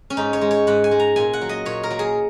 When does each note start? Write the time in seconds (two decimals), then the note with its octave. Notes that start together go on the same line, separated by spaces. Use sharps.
0.10 C#4
0.17 G#2 D#4
0.33 C#5
0.41 G#3
0.51 C#5
0.67 G#2 F#5
0.84 G#5
0.91 G#3
1.00 A#5
1.16 A#2 G#5
1.33 F#5
1.41 F#3
1.49 D#5
1.65 A#2 C#5
1.83 A#4
1.91 F#3
1.99 G#4